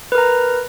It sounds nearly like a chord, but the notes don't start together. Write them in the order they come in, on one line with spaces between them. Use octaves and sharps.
B4 A#4 A#5